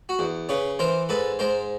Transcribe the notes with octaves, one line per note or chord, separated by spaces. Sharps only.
F#4
E2
C#3 B4 C#5
E3 A#4 C5
G#2 A4 B4
G#2 A#4 C5